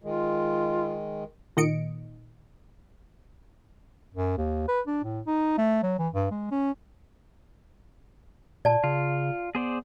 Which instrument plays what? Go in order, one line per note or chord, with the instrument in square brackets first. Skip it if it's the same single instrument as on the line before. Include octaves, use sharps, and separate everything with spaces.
[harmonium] D#3 G#3 [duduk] F4
[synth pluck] A#2 D#3 D#5 C#7 D7
[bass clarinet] F#2
D#2
B4
D4
A2
D#4
A3
F#3
E3
G2
G#3
C#4
[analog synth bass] A#2 [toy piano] D5 A5
[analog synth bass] C#3 [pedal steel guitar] F4
[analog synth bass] B3 [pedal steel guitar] G#4 C5 D5